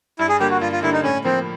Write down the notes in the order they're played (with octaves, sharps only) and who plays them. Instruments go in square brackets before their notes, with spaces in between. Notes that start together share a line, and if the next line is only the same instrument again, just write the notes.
[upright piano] G2 [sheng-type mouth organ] E4
[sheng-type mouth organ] G#4
[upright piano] D3 G3 A#3 [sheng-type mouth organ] G4
[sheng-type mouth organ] F#4
[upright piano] G2 [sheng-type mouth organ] F4
[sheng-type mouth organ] F4
[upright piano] D3 G3 A#3 [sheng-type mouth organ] E4
[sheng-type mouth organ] D#4
[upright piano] A2 [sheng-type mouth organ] C#4
[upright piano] F3 A#3 [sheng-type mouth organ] C4